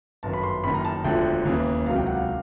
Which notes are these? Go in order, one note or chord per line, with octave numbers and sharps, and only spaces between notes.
G1 F#2 D#3 A5
B5
C6
F#1 F#2 D#3 B5
A#5
A5
E1 D2 D3 F3 G5
D#2 C#3 E3
C#2 C3 D#3 F#3 F5
G5
F#5
F5